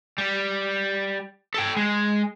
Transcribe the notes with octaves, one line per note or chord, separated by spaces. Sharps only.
G3
A4 G5
G#3